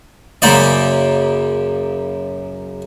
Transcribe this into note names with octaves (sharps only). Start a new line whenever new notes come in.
F#2 C#3 A#3 C5 D5